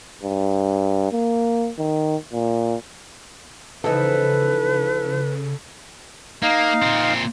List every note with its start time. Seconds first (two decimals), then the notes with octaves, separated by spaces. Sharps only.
0.23 G2
1.12 A#3
1.78 D#3
2.33 A#2
3.84 C#3 E3 F3 D#4 A4 B4
6.43 A#3 D#4 F5
6.82 A#2 C4